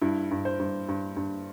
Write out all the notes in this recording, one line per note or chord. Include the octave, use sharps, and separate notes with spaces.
G2 E4
G2
C5
G2
G2
G2